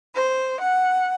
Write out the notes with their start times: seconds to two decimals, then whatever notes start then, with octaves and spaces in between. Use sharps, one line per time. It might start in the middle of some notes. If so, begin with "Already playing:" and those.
0.13 C5
0.60 F#5